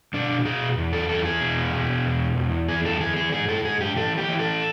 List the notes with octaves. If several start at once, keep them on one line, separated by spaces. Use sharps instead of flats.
B2 D4
B2 G#4
E2
A4
E2 A4
G#4
B2
B2
E2
E2
E3 G#4
A4
E3 G#4
G#4
G#2 G#4
A4
G#2 G#4
G4
E3 A4
G4
E3
A4